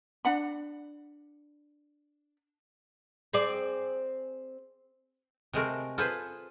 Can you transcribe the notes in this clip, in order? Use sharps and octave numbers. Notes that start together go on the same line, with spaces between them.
D4 F#5 B5
C4 G#4 D5
C3 G#3 A3 A#4
F4 G#4 A4 B4 C5